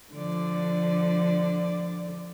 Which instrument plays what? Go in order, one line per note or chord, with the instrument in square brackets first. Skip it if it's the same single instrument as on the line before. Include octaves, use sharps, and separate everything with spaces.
[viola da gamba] D3 F3 D5